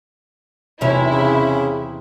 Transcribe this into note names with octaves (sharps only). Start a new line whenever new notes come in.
B1 E2 C3 C#4 E4
C#3